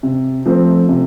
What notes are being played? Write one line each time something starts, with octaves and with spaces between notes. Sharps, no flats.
C3
F3 A3 C4
C3